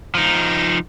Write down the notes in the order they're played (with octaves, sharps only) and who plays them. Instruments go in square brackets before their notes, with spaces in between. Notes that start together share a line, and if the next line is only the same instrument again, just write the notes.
[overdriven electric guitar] F3 D#4